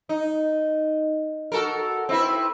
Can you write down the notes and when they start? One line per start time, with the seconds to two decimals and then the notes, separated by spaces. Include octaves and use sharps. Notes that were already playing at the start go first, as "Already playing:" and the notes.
0.09 D#4
1.52 F#4 A4 A#4
2.09 C4 E4 B4